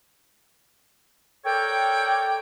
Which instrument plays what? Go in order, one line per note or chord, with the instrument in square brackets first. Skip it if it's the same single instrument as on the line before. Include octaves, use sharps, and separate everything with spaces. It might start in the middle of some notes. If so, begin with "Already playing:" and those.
[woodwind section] A4 A#4 C#5 D5 G5